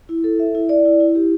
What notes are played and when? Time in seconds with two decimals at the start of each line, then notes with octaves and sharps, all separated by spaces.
0.09 E4
0.24 A4
0.40 E5
0.55 E4
0.69 D5
0.86 E4
1.00 E4
1.15 G4